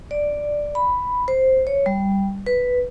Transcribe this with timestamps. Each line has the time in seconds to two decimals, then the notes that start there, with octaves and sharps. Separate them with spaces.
0.11 D5
0.75 B5
1.28 C5
1.67 C#5
1.86 G3
2.46 B4